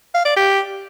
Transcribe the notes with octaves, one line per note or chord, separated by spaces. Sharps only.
F5
D5
G4